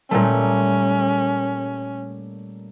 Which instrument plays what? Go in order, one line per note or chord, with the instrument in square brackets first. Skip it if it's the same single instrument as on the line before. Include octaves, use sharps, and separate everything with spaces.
[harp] A#2 G3 A3 [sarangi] C#4